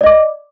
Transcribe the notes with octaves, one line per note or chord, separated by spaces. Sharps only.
D5 D#5 D6